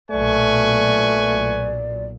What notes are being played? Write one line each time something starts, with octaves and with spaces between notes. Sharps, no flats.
B1 A#2 A3 B4 D5 G#5 C#6